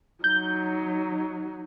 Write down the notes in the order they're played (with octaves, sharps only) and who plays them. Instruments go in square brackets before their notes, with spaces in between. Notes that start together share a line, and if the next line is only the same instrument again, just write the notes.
[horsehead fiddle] F#3 D#4 [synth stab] G6